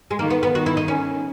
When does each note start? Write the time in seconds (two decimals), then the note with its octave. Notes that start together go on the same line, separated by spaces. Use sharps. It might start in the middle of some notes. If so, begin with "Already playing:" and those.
0.11 G#3
0.19 D#3 A#3
0.31 B3
0.43 B3
0.53 D#3 F#4
0.66 E4
0.77 D#4
0.88 C#4